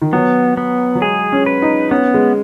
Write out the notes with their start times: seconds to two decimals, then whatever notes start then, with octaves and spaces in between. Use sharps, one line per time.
0.02 D#3
0.13 F#3 B3
0.57 B3
0.95 F#3
1.01 G#3 G#4
1.32 C#4
1.46 B4
1.62 D#4
1.91 B3 C#4
2.14 G#3